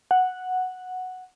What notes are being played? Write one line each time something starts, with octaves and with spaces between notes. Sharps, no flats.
F#5